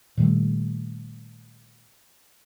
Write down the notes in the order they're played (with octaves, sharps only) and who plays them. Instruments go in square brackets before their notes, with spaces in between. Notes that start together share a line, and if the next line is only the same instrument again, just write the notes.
[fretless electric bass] A#2 D#3 G3 A3